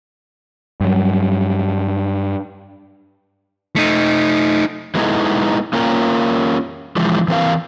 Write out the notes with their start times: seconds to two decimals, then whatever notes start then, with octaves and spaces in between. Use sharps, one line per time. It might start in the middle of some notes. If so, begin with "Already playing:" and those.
0.81 G2 F#3
3.76 A3 D#4
4.95 E3 G#3 B3 D#4 E4 A4
5.73 A#3 C#4 F4 A#4 G5
6.96 E3 F3 G#3
7.28 E3 C4 A#4 F5